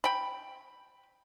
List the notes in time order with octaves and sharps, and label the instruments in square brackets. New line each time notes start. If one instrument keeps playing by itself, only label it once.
[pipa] G5 B5